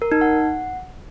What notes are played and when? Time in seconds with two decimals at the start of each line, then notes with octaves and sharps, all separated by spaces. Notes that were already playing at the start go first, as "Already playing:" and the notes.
0.02 A#4
0.11 D#4
0.21 F#5